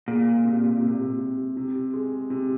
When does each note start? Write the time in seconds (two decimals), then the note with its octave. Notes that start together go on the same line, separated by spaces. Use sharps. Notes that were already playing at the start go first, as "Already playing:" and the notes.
0.08 A#2 G#3
0.45 C3
0.82 C3
1.19 C3
1.57 C3
1.94 G#3
2.30 C3